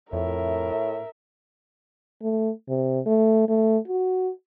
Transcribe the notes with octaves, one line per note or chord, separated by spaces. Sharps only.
F2 A2 A#4 E5
A3
C3
A3
A3
F#4